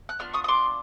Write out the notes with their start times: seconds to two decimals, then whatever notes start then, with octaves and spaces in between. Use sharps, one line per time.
0.09 F#6
0.19 B3 D4 F4 F6
0.33 C#6 D#6
0.44 D#6
0.48 C6 D6